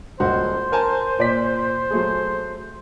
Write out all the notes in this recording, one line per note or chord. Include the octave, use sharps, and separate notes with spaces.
D#1 C#2 F#4 C5
A#4 G#5 A5
A#2 D5 B6
F#3 A3 G#4